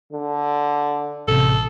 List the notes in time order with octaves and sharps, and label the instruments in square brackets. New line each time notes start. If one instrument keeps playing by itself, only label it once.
[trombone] D3
[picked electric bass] A1 C3 [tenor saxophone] A4